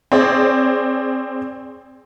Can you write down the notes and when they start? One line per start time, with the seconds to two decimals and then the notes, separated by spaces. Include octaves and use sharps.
0.12 C4 G#4 C#5 D5